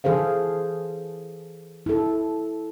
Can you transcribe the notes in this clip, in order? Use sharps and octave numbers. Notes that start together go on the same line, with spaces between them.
E3 G#4 A4 C5 F5
E4 A4